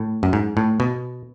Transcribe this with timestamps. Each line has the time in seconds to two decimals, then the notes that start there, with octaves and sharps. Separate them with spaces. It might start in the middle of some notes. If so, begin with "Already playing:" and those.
Already playing: A2
0.23 F#2
0.33 G#2
0.57 A2
0.80 B2